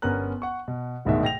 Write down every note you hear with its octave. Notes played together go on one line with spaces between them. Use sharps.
G1 B3 C#4 A#4 A#5 F#6
F#5 C#6
B2
D1 D2 G#2 B2 D#3 E5
G5 A#6 F7